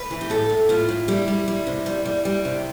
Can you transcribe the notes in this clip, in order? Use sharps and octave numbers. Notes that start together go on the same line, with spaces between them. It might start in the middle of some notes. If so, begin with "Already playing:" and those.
Already playing: B4
E3
G4
A2 A4
A2
A2 F4
A2
G3 E4
G3
G3
C3
G3
G3
G3
C3